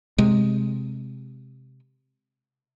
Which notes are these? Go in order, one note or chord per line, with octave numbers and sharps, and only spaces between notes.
C3 G#3